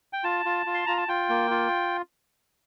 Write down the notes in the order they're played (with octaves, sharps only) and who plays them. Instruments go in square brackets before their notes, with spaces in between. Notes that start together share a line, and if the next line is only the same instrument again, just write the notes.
[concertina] G5
F4 A5
F4
F4
C6
F4 A#5
A5
F4 G5
A#3
F4